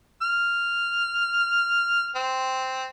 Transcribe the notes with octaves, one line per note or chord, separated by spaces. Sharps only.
F6
C4